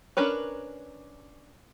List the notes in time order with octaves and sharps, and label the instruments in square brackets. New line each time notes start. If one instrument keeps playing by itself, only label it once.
[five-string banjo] C#4 D4 A#4 B4 C#5